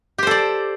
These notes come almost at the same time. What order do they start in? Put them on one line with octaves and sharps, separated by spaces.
G4 C5 A4 D5